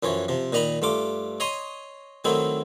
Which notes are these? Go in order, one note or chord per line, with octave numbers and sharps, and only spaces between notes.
F#2 E3 F3 C#5
C3 F3
A#2 D#3 D#5 A#5 B5
G2 A3 F4 D6
C#5 D#5 A#5 C6 D#6
D#3 F#3 A3 C4 D#4 E4